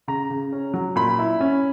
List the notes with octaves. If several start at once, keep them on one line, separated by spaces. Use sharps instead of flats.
C#3 A#5
C#3
C#4
F#3
A#2 B5
E4
C#4